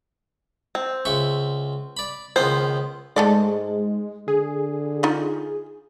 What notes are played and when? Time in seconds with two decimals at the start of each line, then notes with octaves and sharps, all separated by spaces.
0.75 C4
1.05 C#2 E5 C#6
1.97 D5 B5
2.36 C#2 D#3 B3 C5
3.16 G#2 G#3 A3 A4 D5
4.28 D3 G#4
5.03 D#4 F4